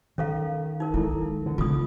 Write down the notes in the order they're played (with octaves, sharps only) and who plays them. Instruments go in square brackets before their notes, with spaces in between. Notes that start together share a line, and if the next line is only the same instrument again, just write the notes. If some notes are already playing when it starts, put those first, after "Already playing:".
[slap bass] D#3 [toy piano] C#4 A4 F5
[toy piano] D#4 A#4
[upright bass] G#3 [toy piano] E4 A4
[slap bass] D3
[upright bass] C#3 G#3 [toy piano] F4 D#6